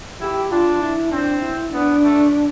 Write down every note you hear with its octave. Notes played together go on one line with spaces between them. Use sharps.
E4 G4
D4 F4
E4
C4 D4
E4
B3 D4
A3